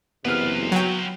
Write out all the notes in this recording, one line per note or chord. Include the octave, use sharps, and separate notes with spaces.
F#1 C3 E3 B3 F4 B4 F6
F#3 G5